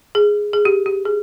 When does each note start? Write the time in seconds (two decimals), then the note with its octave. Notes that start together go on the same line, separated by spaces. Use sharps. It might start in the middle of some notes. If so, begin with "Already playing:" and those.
0.15 G#4
0.53 G#4
0.65 G4
0.86 G4
1.06 G#4